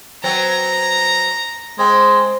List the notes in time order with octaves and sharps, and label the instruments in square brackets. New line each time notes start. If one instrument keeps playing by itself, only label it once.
[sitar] F#3 B3 C4 [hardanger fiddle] A#5
[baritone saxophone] G#3 [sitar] C4